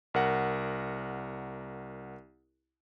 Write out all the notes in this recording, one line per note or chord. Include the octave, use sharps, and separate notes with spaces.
C2 A#4 F#5